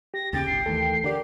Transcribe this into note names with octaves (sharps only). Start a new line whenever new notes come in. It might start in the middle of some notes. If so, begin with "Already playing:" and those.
G4 A#6
D#2 C#3 C#4 G5 A6
G1 C2 C7
D#2 E3 A3 A4
D3 G4 A#4 D5